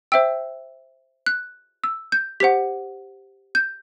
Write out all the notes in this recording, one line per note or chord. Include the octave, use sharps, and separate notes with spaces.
C5 E5 G5 E6
F#6
E6
G6
G4 C5 F#5 B6
G6